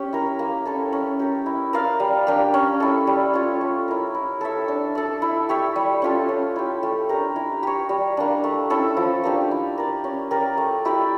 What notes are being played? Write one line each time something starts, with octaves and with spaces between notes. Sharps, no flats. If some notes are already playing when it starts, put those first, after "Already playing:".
Already playing: C#4 G4
E4 A#4
A#3
C#4 E4 A4
C#4
G4 A#4
E4
A#4 D5 F5
G3
A#3 D4 G4
C#4
E4 A4
G3
C#4 F4 C#5
A3
E4 A#4
E4
A4 C#5 E5
D4
A4 D5
E4
G4 C#5 E5
G3
C#4 F4 A4
C#4
E4 G4
A3
D4 G4 A#4
E4
G4 C#5
G3
A#3 D4
A3
C#4 E4 A4
F3
A#3 D4 G4
E4
A#4 D5
C#4
G4 A#4 D5
A3
E4 G4 D5